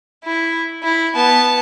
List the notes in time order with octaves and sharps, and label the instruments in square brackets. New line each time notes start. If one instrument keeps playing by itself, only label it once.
[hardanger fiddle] E4
E4
B3 A5